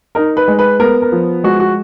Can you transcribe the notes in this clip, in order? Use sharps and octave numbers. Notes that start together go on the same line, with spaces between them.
D#4 A#4
B4
G#3
B4
B3 A#4
A#4
F3
G#3 F#4
F#4